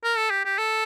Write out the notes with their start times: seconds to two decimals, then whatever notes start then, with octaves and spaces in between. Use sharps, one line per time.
0.04 A#4
0.17 A4
0.30 G4
0.45 G4
0.58 A4